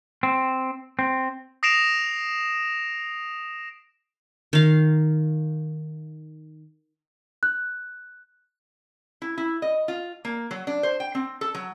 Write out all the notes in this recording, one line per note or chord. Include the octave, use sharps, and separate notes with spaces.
C4
C4
D#6 A#6 C7 D7 E7 F7
D#3 F5
F#6
E4
E4
D#5
F4
A#3
F#3
D4
C5
G5
C4
A4
F#3